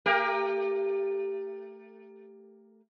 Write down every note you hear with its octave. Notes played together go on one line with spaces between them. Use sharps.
A3 G4 A#4